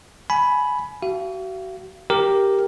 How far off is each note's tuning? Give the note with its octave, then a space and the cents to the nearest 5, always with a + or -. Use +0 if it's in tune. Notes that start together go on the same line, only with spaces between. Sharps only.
G#5 +25 B5 +0
F#4 +35 F5 -40
G4 +0 A#4 +0